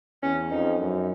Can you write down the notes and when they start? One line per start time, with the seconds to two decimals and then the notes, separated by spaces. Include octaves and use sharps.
0.23 E2 C#4
0.50 F2 D#4
0.79 F#2